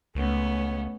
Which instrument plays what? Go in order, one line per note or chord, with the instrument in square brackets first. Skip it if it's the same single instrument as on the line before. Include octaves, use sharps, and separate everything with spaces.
[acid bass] C#2 [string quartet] A3 B3 C#4